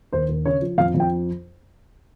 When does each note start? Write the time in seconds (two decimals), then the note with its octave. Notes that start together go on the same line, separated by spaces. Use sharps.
0.13 D#2 C5
0.29 D#2
0.45 C#3 C#5
0.61 F3
0.78 F2 F5
0.94 F2
1.00 G5